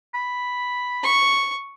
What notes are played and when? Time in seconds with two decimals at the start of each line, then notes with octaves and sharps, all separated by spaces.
0.15 B5
1.04 C#6